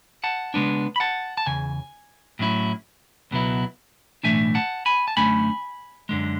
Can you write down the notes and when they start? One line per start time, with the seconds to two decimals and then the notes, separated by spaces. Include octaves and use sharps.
0.24 F#5 A5
0.54 C#3 G#3 B3 D4
0.96 B5
1.00 F#5 A5
1.38 A5
1.46 E2 C#3 G#5
2.39 A2 F#3 C#4 E4
3.31 C#2 B2 F#3 B3 E4
4.23 B1 A2 E3 A3 D4 E5 G#5
4.55 F#5 A5
4.86 G#5 B5
5.08 A5
5.17 F#2 D3 A3 C#4 G#5 B5
6.09 F#2 D3 G#3